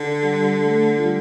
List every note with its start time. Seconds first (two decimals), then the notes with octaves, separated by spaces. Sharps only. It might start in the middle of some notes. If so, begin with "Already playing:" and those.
Already playing: D3
0.22 G3 G4
0.63 A3 A4
0.98 F4
1.03 G3 G4